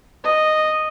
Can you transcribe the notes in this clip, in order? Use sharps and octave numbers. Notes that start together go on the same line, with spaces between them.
D#5